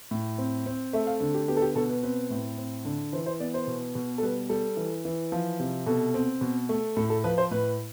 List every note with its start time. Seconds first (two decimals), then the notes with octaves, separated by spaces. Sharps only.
0.11 A2
0.38 C4
0.66 C4
0.93 A3 E5
1.07 F5
1.21 D3
1.34 G4
1.48 B3 G4
1.57 A4
1.62 G4
1.75 B2 A4
1.89 B4
2.03 C4 B4
2.30 A2
2.58 C4
2.85 D3
3.13 E3 C5
3.26 C5
3.40 B3 D5
3.54 C5
3.67 B2
3.95 B2
4.18 A4
4.22 G3 B4
4.49 G3 A4
4.77 E3
5.05 E3
5.32 F3
5.59 C3
5.87 B2 A4
6.14 C4
6.41 B2
6.69 A3
6.97 A2 A4
7.10 A4
7.24 F3 B4
7.38 C5
7.51 A2 B4